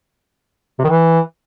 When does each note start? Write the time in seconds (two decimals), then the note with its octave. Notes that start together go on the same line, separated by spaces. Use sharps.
0.79 C3
0.84 D#3
0.89 E3